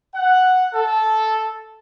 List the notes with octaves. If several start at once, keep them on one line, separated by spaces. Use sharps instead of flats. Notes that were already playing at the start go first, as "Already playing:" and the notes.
F#5
A4